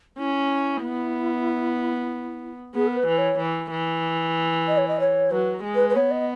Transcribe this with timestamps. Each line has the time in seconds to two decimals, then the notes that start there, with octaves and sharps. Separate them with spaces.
0.18 C#4 E4
0.82 B3
2.75 B3 G#4
2.87 A#4
2.96 B4
3.07 E3
3.18 C#5
3.39 E3
3.71 E3
4.68 D#5
4.77 C#5
4.88 D#5
5.00 C#5
5.31 F#3 B4
5.64 G#3
5.75 B4
5.89 B4
5.95 B3 C#5
6.11 D#5